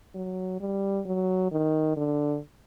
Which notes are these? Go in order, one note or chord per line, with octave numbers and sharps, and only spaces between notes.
F#3
G3
F#3
D#3
D3